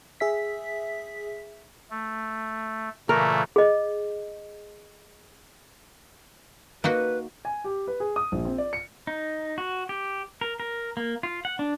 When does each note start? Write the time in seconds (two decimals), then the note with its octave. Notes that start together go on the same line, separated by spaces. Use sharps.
0.20 G#4 E5 B6
1.90 A3
3.09 A#2 C#3 E3 A3 A#4
3.56 G#4 D#5
6.84 A#3 D#4 F#4 B4
7.45 G#5
7.64 G4
7.87 B4
8.00 G#4
8.16 D#6
8.32 A#1
8.45 C4
8.58 D5
8.73 C#7
9.07 D#4
9.58 F#4
9.89 G4
10.41 A#4
10.60 A#4
10.97 A#3
11.23 F4
11.45 F#5
11.59 D4